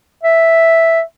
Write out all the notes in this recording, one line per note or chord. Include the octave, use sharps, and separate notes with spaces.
E5